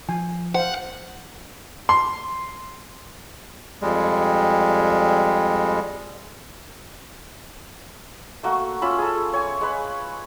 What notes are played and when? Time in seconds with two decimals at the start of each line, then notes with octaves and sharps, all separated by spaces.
0.09 F3 G#5
0.55 C5 F5 F#5
1.89 C6
3.82 F2 G3 G#3
8.43 A3 A#3 F#4
8.82 C#4 F4 E5 B5
8.98 G#4 A4
9.33 C#5 G#5
9.61 G#3 B4